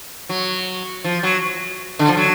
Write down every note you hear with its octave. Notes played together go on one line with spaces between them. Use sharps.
F#3
F3
F#3
D3
F3
F#3